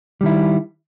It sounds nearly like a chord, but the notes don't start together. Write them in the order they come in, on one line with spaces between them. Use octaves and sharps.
G3 D#3 E4